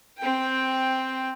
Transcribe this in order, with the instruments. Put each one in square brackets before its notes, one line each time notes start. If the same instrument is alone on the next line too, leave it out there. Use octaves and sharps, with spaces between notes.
[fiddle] C4 G5